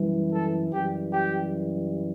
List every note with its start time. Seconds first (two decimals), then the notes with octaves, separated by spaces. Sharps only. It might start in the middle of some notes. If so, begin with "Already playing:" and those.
Already playing: F#2 E3 G3
0.31 A4
0.70 F#2 E3 G3 G4
1.10 G4